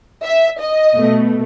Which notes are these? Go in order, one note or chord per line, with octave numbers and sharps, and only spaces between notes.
E5
D#5
B2 A3